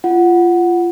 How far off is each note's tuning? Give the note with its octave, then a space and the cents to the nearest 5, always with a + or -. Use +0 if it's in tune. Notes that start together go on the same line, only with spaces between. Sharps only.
F4 -20 F#5 +0